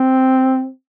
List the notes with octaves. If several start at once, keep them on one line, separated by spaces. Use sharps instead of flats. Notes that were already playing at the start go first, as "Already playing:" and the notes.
Already playing: C4